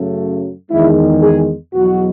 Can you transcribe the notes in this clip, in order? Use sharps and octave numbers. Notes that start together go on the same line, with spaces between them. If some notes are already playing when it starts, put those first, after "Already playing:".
Already playing: F#2 C#3 F#3 A3
E2 D#3 G#3 E4
G#4
E2 B2 F#3 F#4